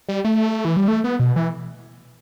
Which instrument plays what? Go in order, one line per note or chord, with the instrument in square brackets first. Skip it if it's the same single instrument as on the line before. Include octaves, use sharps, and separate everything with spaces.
[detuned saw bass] G3
A3
E3
G3
A3
B3
B2
E3